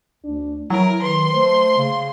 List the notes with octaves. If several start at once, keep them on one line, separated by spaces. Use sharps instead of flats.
D2 D4
E3 F#3 E4 A#4
D#3 B4 C6
A3 C5
C#3